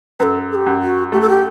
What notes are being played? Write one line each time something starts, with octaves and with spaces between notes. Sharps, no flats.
F#2 A4 B4
A4
G4
F#2
F#4
A3 G4
A4
G4